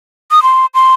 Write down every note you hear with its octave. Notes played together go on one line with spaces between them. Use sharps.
D#6
C6
C6